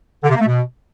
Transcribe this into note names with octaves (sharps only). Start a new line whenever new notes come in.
D3
C3
A#3
A3
B2